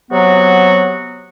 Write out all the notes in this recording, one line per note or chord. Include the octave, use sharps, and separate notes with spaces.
C3 F#3 B3 F#4